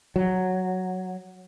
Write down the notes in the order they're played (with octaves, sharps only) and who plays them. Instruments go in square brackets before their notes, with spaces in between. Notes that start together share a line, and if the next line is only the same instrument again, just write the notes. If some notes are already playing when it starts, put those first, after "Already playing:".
[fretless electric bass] F#3